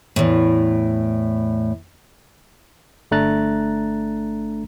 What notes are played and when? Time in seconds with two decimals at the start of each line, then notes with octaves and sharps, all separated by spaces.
0.16 E2 A2
3.11 G1 A3 D4 A#5 F#6 A6